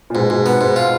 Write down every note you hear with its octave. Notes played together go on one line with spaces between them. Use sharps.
A#2
G#2 B2
G#2
B3
G#2
F4